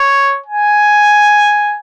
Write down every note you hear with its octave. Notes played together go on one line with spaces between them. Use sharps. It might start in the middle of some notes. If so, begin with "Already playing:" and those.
Already playing: C#5
G#5